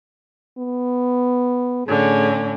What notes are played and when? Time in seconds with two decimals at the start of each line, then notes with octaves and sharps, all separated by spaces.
0.58 B3
1.86 A2 D3 C#4 G#4